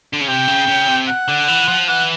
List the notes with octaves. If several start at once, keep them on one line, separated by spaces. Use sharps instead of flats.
D3
C#3
C3 G5
C#3
C#3
C3
F#5
D3
E3
F3
E3 F#5